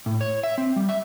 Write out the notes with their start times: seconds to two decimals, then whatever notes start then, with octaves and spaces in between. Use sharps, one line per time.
0.06 A2
0.21 C#5
0.43 E5
0.58 C4
0.76 G3
0.89 E5